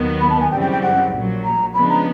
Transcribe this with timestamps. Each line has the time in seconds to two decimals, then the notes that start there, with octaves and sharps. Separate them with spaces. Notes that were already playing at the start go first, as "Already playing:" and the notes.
Already playing: D#2 D#3 F#3 B3
0.21 B5
0.30 A5
0.41 G#5
0.51 F#2 C#3 E3 G3 C4 G5
0.61 G5
0.71 G5
0.82 F#5
1.12 A#1 A#2 F#3
1.44 A#5
1.74 C#3 F3 G#3 B3 D4 B5
1.90 A#5